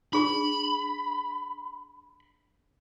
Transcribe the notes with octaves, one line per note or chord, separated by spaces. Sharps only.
D4 G#4 B5